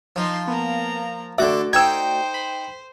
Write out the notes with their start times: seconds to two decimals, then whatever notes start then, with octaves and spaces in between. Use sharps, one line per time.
0.16 F3 D#4 C6
0.48 A#3 B3 A#5
1.38 D3 A3 F#4 A4 D5 E5 D6
1.73 D#4 C5 G5 E6 G#6
2.34 B5